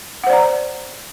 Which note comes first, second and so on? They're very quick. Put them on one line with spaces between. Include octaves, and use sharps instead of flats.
F#5 C5 D5 A#5